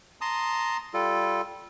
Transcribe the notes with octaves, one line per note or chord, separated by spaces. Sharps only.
A5 A#5 C6 D#6
G3 F4 A4